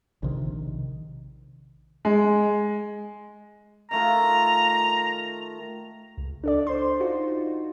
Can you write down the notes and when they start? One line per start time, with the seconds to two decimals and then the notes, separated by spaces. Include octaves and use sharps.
0.23 A#1 C3 D#3
2.05 G#3
3.91 D#3 A3 F4 A#5
6.17 C#2
6.44 D4 A4 D5
6.67 C5 C6
7.00 D#4 F4 F#4